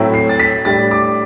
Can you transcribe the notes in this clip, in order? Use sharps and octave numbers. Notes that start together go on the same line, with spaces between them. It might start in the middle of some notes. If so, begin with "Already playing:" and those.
Already playing: A2 F#3 A3 C4 E4
C7
A6
B6
A2 G3 D4 A6
D6